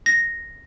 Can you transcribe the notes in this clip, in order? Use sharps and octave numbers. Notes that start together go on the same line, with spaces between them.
A#6